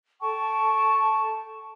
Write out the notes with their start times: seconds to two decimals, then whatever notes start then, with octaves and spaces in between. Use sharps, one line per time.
0.20 A4 G5 A5 C#6